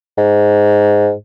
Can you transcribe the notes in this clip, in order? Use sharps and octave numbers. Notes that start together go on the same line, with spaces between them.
G#2